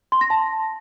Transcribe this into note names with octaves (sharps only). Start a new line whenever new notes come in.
C6
A#6
A5